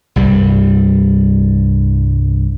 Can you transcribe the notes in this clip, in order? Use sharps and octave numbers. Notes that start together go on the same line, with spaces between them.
C2 G2 G3